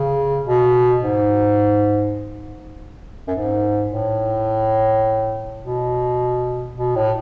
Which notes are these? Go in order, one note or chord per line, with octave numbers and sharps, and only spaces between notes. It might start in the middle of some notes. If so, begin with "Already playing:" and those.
Already playing: C#3
B2
G#2
F#2
G#2
A2
B2
B2
A2